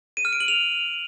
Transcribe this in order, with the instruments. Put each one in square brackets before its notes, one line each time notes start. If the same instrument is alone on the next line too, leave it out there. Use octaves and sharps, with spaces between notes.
[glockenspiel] D#7
F6
D7
F#7
F7